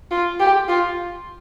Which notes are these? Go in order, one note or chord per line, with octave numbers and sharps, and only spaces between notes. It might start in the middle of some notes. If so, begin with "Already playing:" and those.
F4
G4
F4